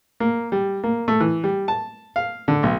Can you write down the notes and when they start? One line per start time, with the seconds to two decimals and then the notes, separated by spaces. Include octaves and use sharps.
0.20 A#3
0.52 G3
0.84 A#3
1.08 A3
1.20 E3
1.44 G3
1.68 A5
2.16 F5
2.48 D3
2.63 B1